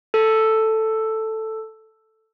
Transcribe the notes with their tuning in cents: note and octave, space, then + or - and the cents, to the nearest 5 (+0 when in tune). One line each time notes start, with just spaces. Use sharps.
A4 +5